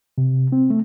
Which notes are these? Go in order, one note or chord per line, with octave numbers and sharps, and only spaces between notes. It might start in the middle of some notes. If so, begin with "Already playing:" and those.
C3
C4
A3